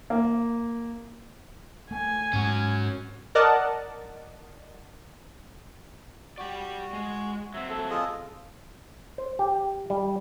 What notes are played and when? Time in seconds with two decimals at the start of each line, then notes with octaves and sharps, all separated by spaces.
0.10 A#3
1.91 A3 G#5
2.33 G#2 C#4 F#4
3.35 A#4 D5 D#5 F#5 A5
6.38 F#4 G4 D5
6.93 G#3
7.54 F#3 C4 E5
7.70 A4
7.90 F4 G#4 A4 D#5
9.18 C5
9.39 G4
9.90 G3